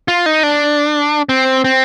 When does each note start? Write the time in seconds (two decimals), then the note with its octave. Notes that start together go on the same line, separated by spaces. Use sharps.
0.08 F4
0.26 D#4
0.43 D4
1.29 C4
1.64 C4